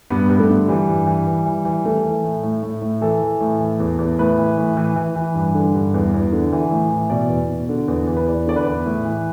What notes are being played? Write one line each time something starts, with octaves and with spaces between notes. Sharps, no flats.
G2 B3
G2 B3
A3
D3
E3 G3
G2
E3
E3
E3
E3
E3 A3
E3
A2
A2
A2
A2
E3 A4
E3
A2
E3
E2
E2
A2 B4
E3
A2
E3
E3
E3
G2
D3
G2
E2
E2
D3
E3
A2
E3
B2 D5
E2
B2
D3
E2
E2
B4
E2 D5
D3 D5
B4
E2
A2
E3